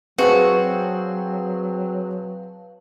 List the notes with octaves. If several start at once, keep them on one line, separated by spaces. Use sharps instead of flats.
F#3 C4 F#4 G#4 B4 F5 A5